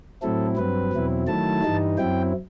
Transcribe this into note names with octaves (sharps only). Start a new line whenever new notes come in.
A2 F#3 C4 E4 A4
G2 F#3 C4 B4
E2 B2 F#3 C4 E4
D#3 F#3 A3 E4 A5
G2 E3 G3 D#4
F#2 F#3 C4 E4 G5